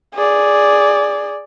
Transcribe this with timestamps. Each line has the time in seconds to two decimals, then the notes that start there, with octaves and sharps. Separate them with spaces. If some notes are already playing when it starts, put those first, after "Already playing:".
0.14 G#4 D5